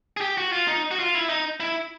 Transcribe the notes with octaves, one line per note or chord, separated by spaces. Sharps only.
G#4
G4
F#4
F4
D#4
F#4
F4
E4
D#4
E4